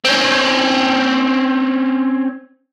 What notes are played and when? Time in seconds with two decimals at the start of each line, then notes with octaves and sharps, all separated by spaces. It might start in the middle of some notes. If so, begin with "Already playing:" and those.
0.05 C4 C#4